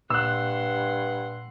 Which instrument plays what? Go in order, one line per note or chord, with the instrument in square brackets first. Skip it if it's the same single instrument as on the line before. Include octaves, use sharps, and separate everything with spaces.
[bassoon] G2 [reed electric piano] A#2 F#6 [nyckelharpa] F#5 C6 [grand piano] E6